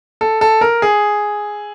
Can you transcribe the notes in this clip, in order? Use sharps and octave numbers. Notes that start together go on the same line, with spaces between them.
A4
A4
A#4
G#4